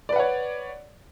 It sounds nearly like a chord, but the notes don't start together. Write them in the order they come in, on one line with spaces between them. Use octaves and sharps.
D5 B4 F#5 C#5